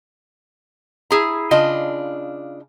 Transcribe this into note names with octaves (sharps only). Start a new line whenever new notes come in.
E4 G#4 A#5
C#3 D4 F4 D#5